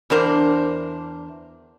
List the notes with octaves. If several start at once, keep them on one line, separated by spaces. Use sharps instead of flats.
E2 D4 A#4 C5